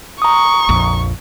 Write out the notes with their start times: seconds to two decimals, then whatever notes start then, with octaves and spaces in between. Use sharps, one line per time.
0.22 A#5 C#6 D#6
0.69 A#1 F2